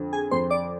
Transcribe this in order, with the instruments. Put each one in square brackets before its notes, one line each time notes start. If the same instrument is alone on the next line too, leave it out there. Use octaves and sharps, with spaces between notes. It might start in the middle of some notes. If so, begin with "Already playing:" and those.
Already playing: [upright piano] F2 D3
[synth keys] G#4 G#5
[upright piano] F2 [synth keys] C5 C6
[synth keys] D5 D6